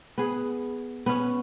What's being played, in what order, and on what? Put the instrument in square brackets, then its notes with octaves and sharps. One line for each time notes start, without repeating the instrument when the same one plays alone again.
[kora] B3 G#4
B3 C#4